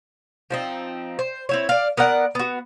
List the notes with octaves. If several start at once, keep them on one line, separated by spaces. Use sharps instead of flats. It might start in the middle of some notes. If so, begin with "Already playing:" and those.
F3 C4 D#4
C5
C4 E4 C#5
D5 F5
B3 A#4 D5 F#5
B3 F#4